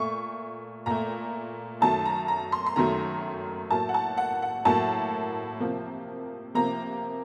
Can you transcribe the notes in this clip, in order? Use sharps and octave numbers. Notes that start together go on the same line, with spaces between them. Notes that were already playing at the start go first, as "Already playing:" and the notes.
Already playing: A#2 A3 C#6
A#2 A3 A#5
F#2 D#3 F#3 A3 A5
A#5
A#5
C6
C6
F#2 D#3 F#3 A3 A#5
A2 F#3 A#3 A5
F#5
A5
F#5
F#5
A2 F#3 A#3 A5
C3 F3 A#3
C3 F3 A#3 A#5